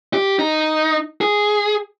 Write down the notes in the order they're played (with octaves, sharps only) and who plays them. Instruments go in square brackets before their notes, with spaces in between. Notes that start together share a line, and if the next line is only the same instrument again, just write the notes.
[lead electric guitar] G4
D#4
G#4